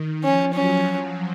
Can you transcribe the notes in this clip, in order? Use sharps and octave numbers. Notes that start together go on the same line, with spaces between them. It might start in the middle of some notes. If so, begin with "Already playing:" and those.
Already playing: D#3
F3 C#4
F#3 C#4